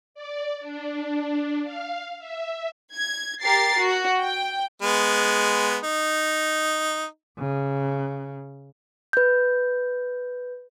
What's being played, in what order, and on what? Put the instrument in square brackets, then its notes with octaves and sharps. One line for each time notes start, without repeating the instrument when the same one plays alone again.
[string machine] D5
D4
F5
E5
[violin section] G#6
G4 A#4 A6 C7
F#4
G5
[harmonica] G#3 B3
D#4
[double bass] C#3
[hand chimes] B4 G6